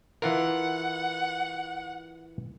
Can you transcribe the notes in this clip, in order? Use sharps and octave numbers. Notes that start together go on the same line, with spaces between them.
E3 F4 A#4 F#5